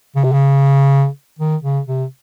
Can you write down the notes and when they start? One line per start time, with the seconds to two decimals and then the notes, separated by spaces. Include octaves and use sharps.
0.16 C#3
0.24 C3
0.32 C#3
1.39 D#3
1.63 C#3
1.87 C3